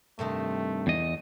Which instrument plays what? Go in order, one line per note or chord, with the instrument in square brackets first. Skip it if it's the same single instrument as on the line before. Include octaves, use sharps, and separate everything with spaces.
[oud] G2 C3 D#3 [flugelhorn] A3
[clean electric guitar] E2 D#5